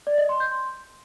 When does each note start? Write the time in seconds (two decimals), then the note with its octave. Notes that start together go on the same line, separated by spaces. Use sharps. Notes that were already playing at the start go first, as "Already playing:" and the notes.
0.07 D5
0.18 D#5
0.29 C6
0.40 G6
0.51 C6